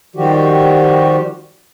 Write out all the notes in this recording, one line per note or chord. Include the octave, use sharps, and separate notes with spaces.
D#3 F3 G3 F#4 G4